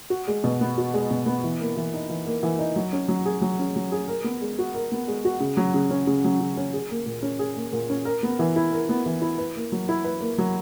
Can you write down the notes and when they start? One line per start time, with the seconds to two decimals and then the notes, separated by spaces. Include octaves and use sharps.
0.10 F#4
0.27 G#3
0.44 B2
0.61 B3
0.78 F#4
0.94 G#3
1.11 B2
1.26 B3
1.44 E3
1.60 A#3
1.77 E3
1.94 D#4
2.09 E3
2.26 A#3
2.43 E3
2.59 D#4
2.76 F#3
2.93 C#4
3.08 F#3
3.26 G#4
3.41 F#3
3.59 C#4
3.76 F#3
3.92 G#4
4.08 A#4
4.24 B3
4.41 G#3
4.59 F#4
4.74 A#4
4.92 B3
5.08 G#3
5.25 F#4
5.40 C#3
5.57 F#3
5.74 C#3
5.91 C#4
6.07 C#3
6.24 F#3
6.41 C#3
6.57 C#4
6.73 G#4
6.90 A#3
7.06 A#2
7.23 C#4
7.39 G#4
7.56 A#3
7.73 A#2
7.90 C#4
8.05 A#4
8.23 B3
8.39 E3
8.56 E4
8.73 A#4
8.89 B3
9.06 E3
9.22 E4
9.38 B4
9.56 A#3
9.72 F#3
9.89 E4
10.04 B4
10.21 A#3
10.38 F#3